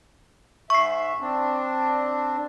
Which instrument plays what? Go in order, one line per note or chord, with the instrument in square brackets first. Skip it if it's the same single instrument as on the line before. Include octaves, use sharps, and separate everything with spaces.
[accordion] G#2 E5 [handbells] C#6 C7
[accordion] C4 D4